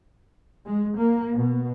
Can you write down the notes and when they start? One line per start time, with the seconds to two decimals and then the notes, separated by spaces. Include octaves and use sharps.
0.66 G#3
0.96 A#3
1.33 B2